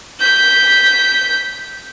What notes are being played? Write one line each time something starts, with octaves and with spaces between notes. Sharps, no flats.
G6 B6